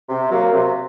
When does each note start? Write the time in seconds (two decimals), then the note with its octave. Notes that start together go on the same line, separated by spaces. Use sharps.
0.09 C3
0.31 F#3 A#3
0.53 C3